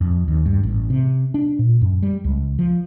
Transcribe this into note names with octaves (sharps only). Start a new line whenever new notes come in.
F2
D#2
G2
A1
C3
D4
A#2
F#2
G3
C#2
F3